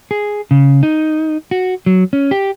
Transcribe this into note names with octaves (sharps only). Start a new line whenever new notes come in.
G#4
C#3
D#4
F#4
F#3
C#4
G4